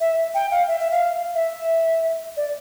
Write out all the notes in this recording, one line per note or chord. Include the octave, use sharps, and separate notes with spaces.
E5
G5
F5
E5
E5
F5
E5
D5